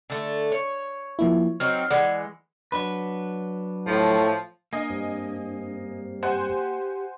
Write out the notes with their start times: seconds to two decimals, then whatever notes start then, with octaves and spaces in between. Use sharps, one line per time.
0.10 D3 A3
0.52 C#5
1.19 F3 A#3 E4
1.60 F#3 C4 D#4 F6
1.90 E3 G#3 D5 F#5
2.72 F#3 D4 B4
3.87 A2 F3
4.73 A#3 D4 D#5 G#5 A#5
4.90 G2 G3 C4
6.23 G4 C5 F#5 G#5